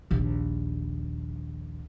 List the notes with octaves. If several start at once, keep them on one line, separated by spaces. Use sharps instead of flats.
A#1 D#2